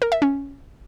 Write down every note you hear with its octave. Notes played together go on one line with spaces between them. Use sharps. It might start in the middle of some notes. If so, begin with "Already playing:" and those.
A#4
E5
C#4